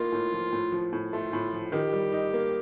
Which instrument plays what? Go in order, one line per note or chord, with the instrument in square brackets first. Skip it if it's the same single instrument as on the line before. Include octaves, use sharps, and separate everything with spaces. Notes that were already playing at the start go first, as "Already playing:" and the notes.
Already playing: [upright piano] A2 A#3 D#4 [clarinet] F4
[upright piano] A2
F3
A2
F3
A2
[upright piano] A3 [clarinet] F4
[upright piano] A2
F3
[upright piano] D#3 [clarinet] G4
[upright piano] G3
D#4
A#3